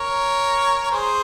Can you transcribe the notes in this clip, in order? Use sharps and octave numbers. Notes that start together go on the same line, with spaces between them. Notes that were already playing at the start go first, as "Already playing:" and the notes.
Already playing: A#4 C#5
G#4 C5